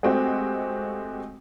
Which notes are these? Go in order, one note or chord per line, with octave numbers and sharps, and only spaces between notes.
G#3 A3 C4 F#4 G4